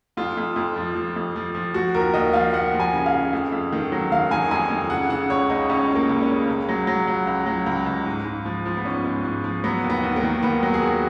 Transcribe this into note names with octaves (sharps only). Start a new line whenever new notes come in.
F2 F4
F2
F2
F3
F3
F2
F3
F3
F3 F#4
D#2 A#4
D#2 D#5
F3 F5
D#2 F#5
F3
G#5
C#3
F5
C#3
F2
F2
D#3
F#3
D#3 F5
D#3 G#5
F2 G#5
F2
C#3 F#5
C#3 F#5
C#2 C#5
C#2 D#4
C#2 C#4
C#3
A#3
C#2
C#4
C#3
C#2
F#3
F#3
F#3
C#2
F#3
C#2
C#2
G#2
G#2
F3
F3
B3
G#2 C#4
G#2
G#2
F3
F#3 B3
D#2
B3
D#2
A#3
D#3
D#2 B3
F#3
G#4
D#2 F#4